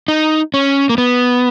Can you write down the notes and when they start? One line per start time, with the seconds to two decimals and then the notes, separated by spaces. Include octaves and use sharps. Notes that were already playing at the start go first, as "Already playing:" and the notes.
0.08 D#4
0.54 C#4
0.90 A#3
0.98 B3